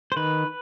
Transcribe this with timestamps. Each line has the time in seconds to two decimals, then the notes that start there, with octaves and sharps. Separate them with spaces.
0.12 C5
0.16 D#3 B4